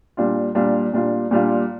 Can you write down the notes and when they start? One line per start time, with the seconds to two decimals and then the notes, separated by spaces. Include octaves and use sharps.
0.17 A#2 G3 D4 F4
0.55 A#2 G3 D4 F4
0.93 A#2 G3 D4 F4
1.31 A#2 G3 D4 F4